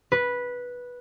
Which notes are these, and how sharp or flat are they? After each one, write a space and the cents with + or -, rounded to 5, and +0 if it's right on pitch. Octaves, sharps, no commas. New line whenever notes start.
B4 -10